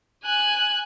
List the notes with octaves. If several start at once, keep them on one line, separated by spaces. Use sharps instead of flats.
G#5 F#6